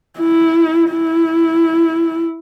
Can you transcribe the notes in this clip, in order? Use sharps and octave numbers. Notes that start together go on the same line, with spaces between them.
E4
E4